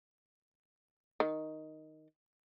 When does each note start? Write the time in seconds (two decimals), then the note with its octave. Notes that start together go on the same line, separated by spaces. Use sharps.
1.20 D#3